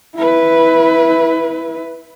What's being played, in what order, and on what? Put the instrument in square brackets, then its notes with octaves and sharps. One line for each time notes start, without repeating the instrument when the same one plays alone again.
[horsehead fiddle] E4 B4